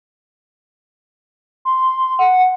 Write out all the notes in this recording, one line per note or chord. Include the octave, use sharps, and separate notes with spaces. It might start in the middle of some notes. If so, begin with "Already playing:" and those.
C6
F#5